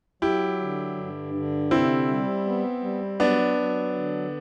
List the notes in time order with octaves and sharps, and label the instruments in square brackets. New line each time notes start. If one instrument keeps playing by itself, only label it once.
[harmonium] F#3 [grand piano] E4 G4
[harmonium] D3
G2
D3
[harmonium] C3 [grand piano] C4 E4
[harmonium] G3
B3
G3
[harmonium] F#3 [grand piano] B3 D4
[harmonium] F#3
D3